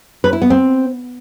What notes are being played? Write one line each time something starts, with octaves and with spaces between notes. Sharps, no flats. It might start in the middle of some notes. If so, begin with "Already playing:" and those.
B4
E4
B3
C4